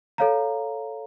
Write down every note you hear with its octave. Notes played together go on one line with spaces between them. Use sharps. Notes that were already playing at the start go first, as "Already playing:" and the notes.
A4 C#5 F5 A#5